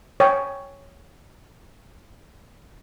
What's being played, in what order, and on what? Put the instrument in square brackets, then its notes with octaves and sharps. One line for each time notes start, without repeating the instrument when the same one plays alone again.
[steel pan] C#5 G5